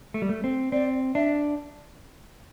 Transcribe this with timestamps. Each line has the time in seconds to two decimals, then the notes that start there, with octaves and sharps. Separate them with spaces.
0.14 A3
0.22 G3
0.29 A3
0.44 C4
0.72 C4 D5
1.15 D4 E5